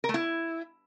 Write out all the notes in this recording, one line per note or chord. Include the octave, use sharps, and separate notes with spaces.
A#4
A3
E4